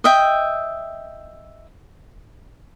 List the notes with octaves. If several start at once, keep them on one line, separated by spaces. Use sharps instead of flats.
D#5 E5 G5